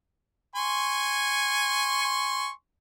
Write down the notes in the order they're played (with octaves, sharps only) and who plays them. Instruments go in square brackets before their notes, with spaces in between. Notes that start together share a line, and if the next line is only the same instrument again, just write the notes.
[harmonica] G#5 C6 C#6